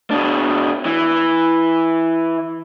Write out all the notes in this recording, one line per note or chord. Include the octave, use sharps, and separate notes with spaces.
B2 D4
E3